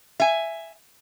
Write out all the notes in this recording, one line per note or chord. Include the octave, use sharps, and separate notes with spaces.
E5 G#5